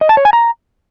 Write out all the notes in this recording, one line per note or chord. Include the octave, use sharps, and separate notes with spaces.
D#5
A5
C#5
G#5
A#5